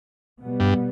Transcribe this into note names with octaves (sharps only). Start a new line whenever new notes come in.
B2 G3 B3
G2